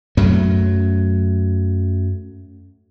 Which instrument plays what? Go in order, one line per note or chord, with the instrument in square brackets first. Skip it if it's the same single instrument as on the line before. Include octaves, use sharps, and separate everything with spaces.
[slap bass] F#2 F#3 A3